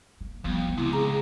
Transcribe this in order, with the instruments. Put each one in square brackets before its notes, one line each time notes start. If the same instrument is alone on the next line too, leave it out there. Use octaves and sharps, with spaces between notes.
[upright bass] A#3
[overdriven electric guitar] F2 [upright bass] G3 B3
[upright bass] A3 B3
[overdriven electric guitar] C#2 C3 [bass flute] E4
[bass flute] G#4 [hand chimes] A#5